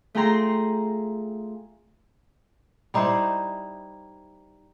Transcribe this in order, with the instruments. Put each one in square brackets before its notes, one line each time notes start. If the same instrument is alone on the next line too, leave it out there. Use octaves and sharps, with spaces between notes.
[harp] A3 F4 G#4 G5 A#5 C6
[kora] G3 D#4 E4 C5